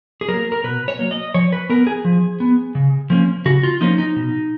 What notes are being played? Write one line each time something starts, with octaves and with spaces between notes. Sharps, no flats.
G#4
F#3 A#3 A#4
A#4
B2 B4
C#5
F#3 A#3
D#5
F3 C#5
B4
B3 A#4
G#4
F3
B3
C#3
F3 A#3 C#4
C#3 F#4
F4
F3 A#3 C#4 D#4
D#4
B2